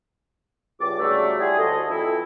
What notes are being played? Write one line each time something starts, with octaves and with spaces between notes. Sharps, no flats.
C#2 G2 D6
G#2 C#3 F#3 G3 A3
G3 G#3 E4 F#4 G#4
D2 A4 D#5
F2 E3 E4